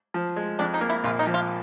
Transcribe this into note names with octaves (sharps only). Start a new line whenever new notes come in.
F3
G#3
F2 D4
D#4
A#3
E4
A#1 F4
D#4
F3
F4